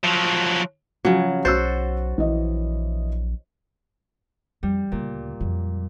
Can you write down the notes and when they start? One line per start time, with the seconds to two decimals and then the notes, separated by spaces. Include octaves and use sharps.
0.04 F3 F#3
1.05 C#3 F3 F#3 C#4
1.45 B1 F#4 C5 E6 A6
2.18 A#1 E3 D#5
4.63 F2 G3
4.92 D2 A#2 C#3
5.41 F2 F#3